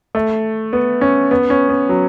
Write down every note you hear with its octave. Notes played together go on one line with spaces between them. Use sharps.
A3
B3
C#4
B3
C#4
B3
F#3